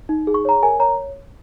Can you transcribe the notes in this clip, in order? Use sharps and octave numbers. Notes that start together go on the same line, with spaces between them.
D#4
G#4
C#6
C#5 A#5
A#4 G#5
C#5 A#5